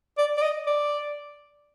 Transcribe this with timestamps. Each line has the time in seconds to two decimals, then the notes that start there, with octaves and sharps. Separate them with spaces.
0.18 D5
0.38 D5
0.42 D#5
0.67 D5